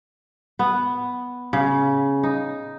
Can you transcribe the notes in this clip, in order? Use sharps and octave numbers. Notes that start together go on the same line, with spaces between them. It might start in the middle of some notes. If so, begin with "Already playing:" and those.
B3
C#3
D#4